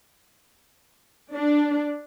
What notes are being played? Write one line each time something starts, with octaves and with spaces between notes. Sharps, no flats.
D4